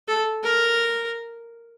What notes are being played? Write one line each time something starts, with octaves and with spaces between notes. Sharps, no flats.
A4
A#4